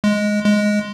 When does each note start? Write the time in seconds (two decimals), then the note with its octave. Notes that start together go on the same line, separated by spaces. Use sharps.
0.04 G#3
0.44 G#3